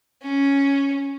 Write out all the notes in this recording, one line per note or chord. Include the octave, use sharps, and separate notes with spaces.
C#4